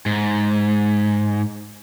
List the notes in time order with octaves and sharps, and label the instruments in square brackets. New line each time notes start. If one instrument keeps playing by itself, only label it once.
[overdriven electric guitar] G#2